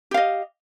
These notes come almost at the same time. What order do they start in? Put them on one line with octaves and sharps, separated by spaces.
G4 F5 D#5